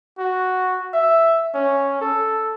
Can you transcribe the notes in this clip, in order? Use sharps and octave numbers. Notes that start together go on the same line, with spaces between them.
F#4
E5
C#4
A4